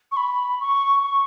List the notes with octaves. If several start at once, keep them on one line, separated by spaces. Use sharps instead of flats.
C#6
B5
C#6
C#6